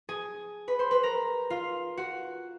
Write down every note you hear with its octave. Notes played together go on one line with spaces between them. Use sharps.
G#4 G#5
B4 B5
C5 C6
B4 B5
A#4 A#5
F4 F5
F#4 F#5